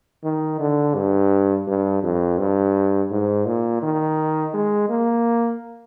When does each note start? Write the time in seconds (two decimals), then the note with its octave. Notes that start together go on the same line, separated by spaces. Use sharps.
0.23 D#3
0.60 D3
0.95 G2
1.67 G2
2.03 F2
2.38 G2
3.11 G#2
3.46 A#2
3.83 D#3
4.54 G#3
4.89 A#3